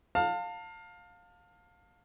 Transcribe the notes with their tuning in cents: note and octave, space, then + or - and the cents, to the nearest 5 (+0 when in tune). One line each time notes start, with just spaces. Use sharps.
F5 +20 A5 +35